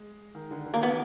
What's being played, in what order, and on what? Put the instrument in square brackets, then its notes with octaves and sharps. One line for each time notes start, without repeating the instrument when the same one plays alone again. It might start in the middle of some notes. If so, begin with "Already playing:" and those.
Already playing: [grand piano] G#3
D#3
D3
D3
[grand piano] D#3 [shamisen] A#3
[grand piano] E3 [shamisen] B3